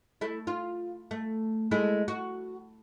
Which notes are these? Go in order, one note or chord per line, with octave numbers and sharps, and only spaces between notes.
A3 E4
F4
A3
G#3 A3 E4
F#4